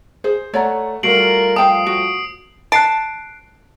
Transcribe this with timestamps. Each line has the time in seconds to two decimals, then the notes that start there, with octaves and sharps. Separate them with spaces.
0.24 G#4 C5
0.54 A3 C#5 D5 F#5 A#5
1.03 G3 A3 F4 F#4 A#4 C7 D7 F#7
1.56 F3 F5 G5 A5 D#6
1.87 F#4 D7
2.72 A5 F#6 C7 D7